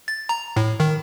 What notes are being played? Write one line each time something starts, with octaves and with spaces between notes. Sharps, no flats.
A6
A#5
A2
D#3